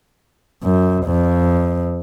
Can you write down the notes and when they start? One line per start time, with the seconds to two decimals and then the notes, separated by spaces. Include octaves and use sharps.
0.63 F#2
1.06 F2